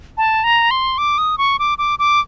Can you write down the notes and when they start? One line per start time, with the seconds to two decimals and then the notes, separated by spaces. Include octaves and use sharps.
0.17 A5
0.44 A#5
0.71 C6
0.98 D6
1.18 D#6
1.38 C#6
1.59 D6
1.78 D6
1.99 D6